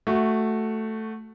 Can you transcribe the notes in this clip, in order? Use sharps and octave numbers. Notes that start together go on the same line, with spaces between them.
A3 F#4